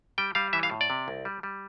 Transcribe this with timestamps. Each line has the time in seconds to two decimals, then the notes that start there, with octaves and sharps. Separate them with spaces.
0.18 G3 G5
0.35 G3 F5
0.53 E3 E5
0.63 F5
0.71 A2
0.81 D5
0.90 C3
1.08 C2
1.25 G3
1.43 G3